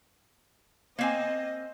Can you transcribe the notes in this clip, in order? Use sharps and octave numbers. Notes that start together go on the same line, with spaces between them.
A#3 C4 D#5 G#5